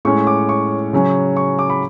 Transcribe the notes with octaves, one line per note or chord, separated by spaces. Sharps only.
A2 G#3 C#4 C#6
D6
C#6
C#3 F#3 C#4
C#6
D6
B5